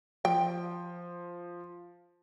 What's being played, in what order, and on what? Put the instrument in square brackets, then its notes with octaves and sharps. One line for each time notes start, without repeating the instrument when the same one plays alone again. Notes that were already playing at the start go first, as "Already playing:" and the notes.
[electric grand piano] F3 [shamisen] G5